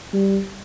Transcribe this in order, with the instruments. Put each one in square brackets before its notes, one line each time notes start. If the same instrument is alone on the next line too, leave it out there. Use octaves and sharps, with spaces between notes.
[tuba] G3